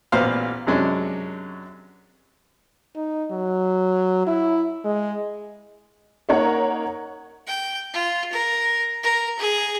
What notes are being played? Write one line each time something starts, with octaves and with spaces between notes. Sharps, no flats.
A1 A#2 B3 C5 F5 F6
F#2 C3 F#3 G#3 C#4 D4
D#4
F#3
E4
G#3
A#3 D#4 A#4 C#5 F#5 A#5
G5
F4
A#4
A#4
G#4